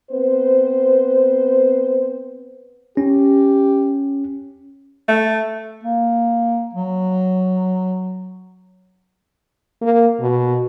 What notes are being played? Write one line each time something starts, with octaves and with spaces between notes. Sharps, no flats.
B3 C4 B4 C5
C#4 G4
A3
A#3
F#3
A#3
B2